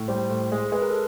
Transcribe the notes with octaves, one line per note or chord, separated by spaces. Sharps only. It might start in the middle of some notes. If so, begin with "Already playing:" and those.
Already playing: A2
G3 C5
A2 C5
G#3
G#3 B4
A#4
A4